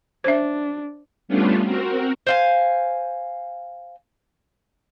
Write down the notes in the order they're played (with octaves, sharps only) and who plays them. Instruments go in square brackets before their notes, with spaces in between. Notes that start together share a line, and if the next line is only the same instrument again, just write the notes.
[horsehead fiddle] D4 [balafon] C5 E5
[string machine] G3 A3 B3 C#4 D4 F4
C4 F#4 A#4
[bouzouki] C5 F5 G#5